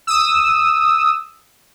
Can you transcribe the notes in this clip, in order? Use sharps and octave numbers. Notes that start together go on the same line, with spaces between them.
D#6 E6